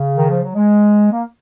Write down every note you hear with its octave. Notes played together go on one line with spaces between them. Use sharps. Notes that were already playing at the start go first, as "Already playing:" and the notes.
Already playing: C#3
D#3
F3
F#3
G#3
A#3